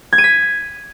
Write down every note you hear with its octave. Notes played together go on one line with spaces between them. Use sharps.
G#6
D#7
B6